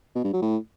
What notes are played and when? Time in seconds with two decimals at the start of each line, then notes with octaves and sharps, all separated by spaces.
0.15 B2
0.24 G2
0.33 F#3
0.42 A2